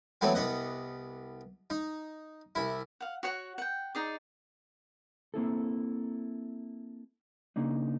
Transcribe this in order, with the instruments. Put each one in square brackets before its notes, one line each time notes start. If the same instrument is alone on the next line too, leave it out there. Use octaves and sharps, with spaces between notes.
[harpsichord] E3 F#3 A3 B3 C4
C2 B3 D#5 F#5
D#4
C2 E4
[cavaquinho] F5 F#5
F#4 C#5 F#5
F#5 G5
D#4 G#4 D5
[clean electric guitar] A#3 C4 E4 A4
C#3 A#3 D4 D#4